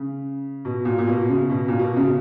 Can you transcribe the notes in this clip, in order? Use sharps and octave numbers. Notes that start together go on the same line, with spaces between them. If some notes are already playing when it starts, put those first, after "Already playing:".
Already playing: C#3
B2
A#2
A#2
B2
C#3
B2
A#2
B2
C#3